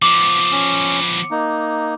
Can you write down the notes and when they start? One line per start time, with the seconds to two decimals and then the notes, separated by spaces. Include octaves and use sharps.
0.02 F3 B3 D6
0.52 C#4
1.31 A#3 D#4